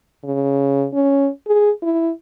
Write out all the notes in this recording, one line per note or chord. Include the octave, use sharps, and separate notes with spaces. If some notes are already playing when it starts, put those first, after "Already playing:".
C#3
C#4
G#4
E4